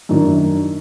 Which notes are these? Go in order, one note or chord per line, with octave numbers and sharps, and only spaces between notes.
F#2 D#3 D4